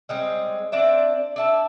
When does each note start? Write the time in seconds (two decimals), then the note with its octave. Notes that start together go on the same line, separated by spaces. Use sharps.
0.09 G3 G#3 C4
0.72 C4 D4 D5 E5
1.36 D4 E4 A5